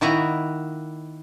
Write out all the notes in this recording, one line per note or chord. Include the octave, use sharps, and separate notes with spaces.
D#3 A#3 E4 F#4 D#5 A#5